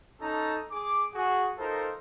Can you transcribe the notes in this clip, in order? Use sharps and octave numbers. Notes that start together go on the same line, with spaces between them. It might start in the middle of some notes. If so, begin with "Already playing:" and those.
C#4 D#4 A4 A5 A#5
G#4 D6
F#4 G#4
D#4 F4 A4 A#4 C5